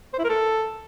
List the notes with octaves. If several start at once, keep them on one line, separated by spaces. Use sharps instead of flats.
C5
E4
A#4
A4